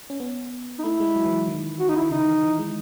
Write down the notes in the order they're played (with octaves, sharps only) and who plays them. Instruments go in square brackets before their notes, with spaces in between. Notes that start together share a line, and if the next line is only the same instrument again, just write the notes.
[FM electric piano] C#4
B3
[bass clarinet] D#4
[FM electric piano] A3 [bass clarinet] E4
[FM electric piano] G#3
F#3
E3
D#3
[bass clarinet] F#4
D#4
E4
[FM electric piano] D#3
[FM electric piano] C#3 [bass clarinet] D#4
[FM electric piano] D#3
E3
E3
G#3